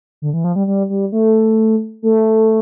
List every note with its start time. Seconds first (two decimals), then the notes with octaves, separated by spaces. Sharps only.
0.22 D3
0.34 E3
0.44 F3
0.56 G3
0.67 G3
0.89 G3
1.12 A3
2.02 A3